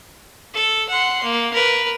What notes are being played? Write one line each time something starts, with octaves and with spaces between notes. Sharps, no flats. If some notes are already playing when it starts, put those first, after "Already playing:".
A4
F#5 C6
A#3
A#4 B4